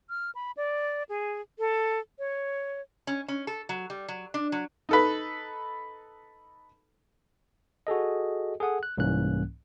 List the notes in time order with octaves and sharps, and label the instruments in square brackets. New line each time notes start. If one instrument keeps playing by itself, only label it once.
[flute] F6
B5
D5
G#4
A4
C#5
[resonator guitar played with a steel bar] C#4
C#4
A4
F#3
G3
F#3
D4
F#3
[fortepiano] D#4 A4 B4
[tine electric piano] F#4 G#4 A4 D#5
G#4 A4 F#5 D#6
F#6
C2 G#2 E3 A#3 C#4 F#6